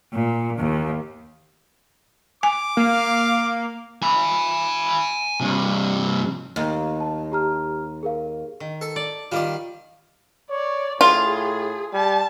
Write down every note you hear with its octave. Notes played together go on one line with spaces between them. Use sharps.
A#2
D#2
G#5 D6
A#3 F5
G#5 B5
G2 C3
D#2
A5
G4 A#5 F6
G#4 A#4 F5
D#3
A4
D5
D#3 G3 F4 D5
C#5 D5
A2 F4 G#4
G3 A5